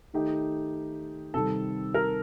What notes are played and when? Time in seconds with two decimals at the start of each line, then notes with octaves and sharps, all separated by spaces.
0.14 D#3 A3 D#4 G4
1.34 C3 D#3 G3 A4
1.94 A#4